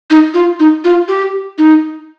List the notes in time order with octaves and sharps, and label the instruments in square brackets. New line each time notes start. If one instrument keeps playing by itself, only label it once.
[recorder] D#4
F4
D#4
F4
G4
D#4